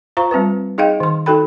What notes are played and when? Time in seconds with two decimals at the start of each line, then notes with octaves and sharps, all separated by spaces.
0.17 F4 C5 F5 A#5 C#6
0.31 G3 C4 F4 B4
0.78 D#4 G#4 D#5 F5 G5
1.00 D#3 C6
1.26 D#4 F#4 A4 G5 B5